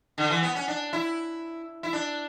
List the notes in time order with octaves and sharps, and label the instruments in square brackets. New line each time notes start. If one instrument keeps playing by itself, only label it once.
[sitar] D3
E3
B3
C#4
D4
E4
E4
D4